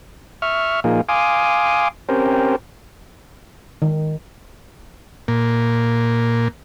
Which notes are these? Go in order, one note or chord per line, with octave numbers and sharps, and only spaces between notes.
E5 C#6 F6
A#2 F3 A#3 D#4 F4 G#4
F5 G#5 C6 D6 D#6
C4 C#4 G4 A#4 C5
D#3
A#2